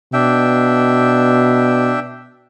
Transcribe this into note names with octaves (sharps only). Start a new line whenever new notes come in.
B2 D4 E5 G5